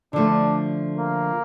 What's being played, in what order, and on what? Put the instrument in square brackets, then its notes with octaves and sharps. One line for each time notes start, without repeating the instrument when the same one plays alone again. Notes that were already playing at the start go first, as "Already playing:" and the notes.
[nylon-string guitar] D3 F3 A3 [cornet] D4
[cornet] A#3